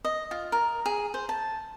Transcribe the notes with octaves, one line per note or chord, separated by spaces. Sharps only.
D#5
F4
A#4
G#4
C5
A5